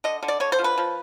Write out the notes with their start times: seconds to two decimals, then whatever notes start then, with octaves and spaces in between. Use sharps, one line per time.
0.04 D3 D#5
0.23 D3
0.28 D5
0.40 D3 C#5
0.52 C5
0.59 F3
0.64 B4
0.78 F3